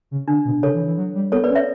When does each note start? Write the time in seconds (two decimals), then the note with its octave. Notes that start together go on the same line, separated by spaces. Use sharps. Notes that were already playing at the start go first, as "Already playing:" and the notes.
0.11 C#3
0.28 D3 D4
0.45 B2
0.63 C#3 A4 C#5
0.74 E3
0.86 E3
0.97 F#3
1.15 G3
1.32 B3 A4 C#5
1.44 B4 D5
1.49 C#4
1.55 C#5 E5